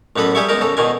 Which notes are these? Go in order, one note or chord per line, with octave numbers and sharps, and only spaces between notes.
A1 F#2 B3 A4 B4
G3 G4 G#4 E5 C#6
E2 G#3 D#4 A#4
C#3 A4
E2 B2 D#3 G#5